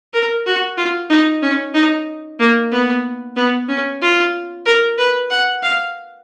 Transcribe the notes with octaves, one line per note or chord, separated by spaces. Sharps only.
A#4
F#4
F4
D#4
C#4
D#4
A#3
B3
B3
C#4
F4
A#4
B4
F#5
F5